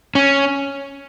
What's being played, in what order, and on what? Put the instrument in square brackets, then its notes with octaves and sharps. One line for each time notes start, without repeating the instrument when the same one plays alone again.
[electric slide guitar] C#4